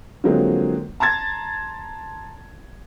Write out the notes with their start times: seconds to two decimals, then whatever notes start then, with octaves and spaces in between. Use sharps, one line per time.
0.24 D3 F3 F#3 G#3 A#3 C4
1.00 A5 A#5 C6 G#6 A6